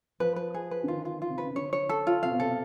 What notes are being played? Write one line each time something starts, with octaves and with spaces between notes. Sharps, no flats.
F3 B4
B4
G#4
B4
D3
D#3 F4
F4
F4
C3
C#3 B4
D3 C#5
C#5
A4
F4
C3 F5
B2
C3 A4